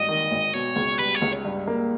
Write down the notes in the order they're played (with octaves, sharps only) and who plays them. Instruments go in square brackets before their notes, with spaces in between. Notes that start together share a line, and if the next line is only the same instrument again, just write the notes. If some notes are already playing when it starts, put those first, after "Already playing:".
Already playing: [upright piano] G#1 G2 [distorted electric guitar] D#5
[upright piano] D#3
G#1
[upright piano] B2 [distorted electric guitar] C#5
[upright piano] C#2
[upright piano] G3 [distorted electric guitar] B4
[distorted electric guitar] C#5
[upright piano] C#2
G2
A#3